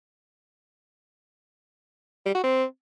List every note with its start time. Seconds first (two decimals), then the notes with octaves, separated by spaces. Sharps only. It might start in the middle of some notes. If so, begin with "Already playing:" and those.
2.26 G3
2.35 F#4
2.43 C4